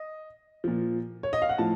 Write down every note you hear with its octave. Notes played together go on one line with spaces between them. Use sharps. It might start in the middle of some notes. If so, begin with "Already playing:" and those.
Already playing: D#5
A#2 F3
C#5
D#5
F5
F#5
A2 F3 A5